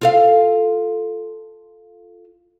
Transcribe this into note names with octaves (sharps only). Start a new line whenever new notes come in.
F4 A4 F5